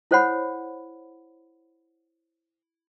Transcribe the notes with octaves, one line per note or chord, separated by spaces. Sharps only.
E4 A4 C5 C#5 F#5 B5